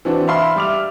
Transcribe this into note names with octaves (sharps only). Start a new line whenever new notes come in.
E3 C4 D4 F#4
E5 F5 B5 C6 F6
G3 E5 D6 F6 F7